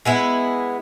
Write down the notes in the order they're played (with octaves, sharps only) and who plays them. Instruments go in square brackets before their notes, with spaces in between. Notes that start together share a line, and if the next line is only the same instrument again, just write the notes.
[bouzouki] G#3 B3 E4